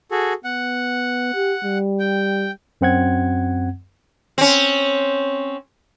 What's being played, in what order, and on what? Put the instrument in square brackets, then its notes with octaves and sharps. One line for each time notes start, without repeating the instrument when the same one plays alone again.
[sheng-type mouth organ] F#4 G#4 A4
[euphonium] B3 [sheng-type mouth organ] F#5
[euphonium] G4
G3
[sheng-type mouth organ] G5
[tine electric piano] F#2 C4 F#5 G#6
[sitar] C4 C#4